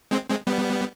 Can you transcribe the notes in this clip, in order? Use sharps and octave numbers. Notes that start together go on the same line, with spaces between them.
G#3 C4
G#3 C4
G3 B3